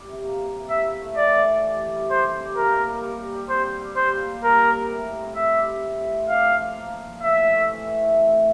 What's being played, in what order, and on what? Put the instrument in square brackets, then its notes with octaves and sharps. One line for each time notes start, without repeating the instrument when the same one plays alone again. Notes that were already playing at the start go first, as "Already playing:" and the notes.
Already playing: [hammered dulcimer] G3
C3
A#3
A#3
C3
[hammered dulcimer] E4 [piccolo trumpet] E5
[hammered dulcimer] E4
A3
[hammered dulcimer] E3 [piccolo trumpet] D5
[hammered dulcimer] E3
E3
G4
G4
G3
[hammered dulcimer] G4 [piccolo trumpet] C5
[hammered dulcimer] C3
G4
[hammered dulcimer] A#3 [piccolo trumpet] A#4
[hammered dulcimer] A#3
G3
G3
G3
G3
[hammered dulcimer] C4 [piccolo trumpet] C5
[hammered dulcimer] G3
G3
[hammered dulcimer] G3 [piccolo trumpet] C5
[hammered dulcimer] A#2
A#2
[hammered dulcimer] G3 [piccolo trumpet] A#4
[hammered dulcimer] G3
C4
A2
G3
C4
[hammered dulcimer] C4 [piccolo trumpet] E5
[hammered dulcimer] G3
E4
G3
A2
C4
[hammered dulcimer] D4 [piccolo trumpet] F5
[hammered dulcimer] F3
F3
A#3
F3
F3
[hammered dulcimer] A2 [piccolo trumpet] E5
[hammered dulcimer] A2
A3
E3
E3
A2
C4
A2